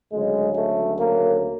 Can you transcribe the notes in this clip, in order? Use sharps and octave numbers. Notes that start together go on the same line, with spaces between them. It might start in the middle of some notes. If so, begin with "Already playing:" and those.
D2 C#3 F#3 G#3
A3
A#3